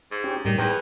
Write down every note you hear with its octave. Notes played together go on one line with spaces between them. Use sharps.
G#2
C#4 G4
A2 D#3 G3
E2 B4 G5